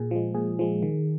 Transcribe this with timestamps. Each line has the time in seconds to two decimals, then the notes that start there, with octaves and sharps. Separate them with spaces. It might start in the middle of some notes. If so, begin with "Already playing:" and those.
Already playing: A#2 G#4
0.11 F3 G#3
0.35 A#2 G#4
0.59 F3 G#3
0.83 D#3